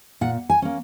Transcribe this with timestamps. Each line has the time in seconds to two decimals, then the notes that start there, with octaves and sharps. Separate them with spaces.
0.21 A#2 F#5
0.50 G#5
0.62 A#3 C#4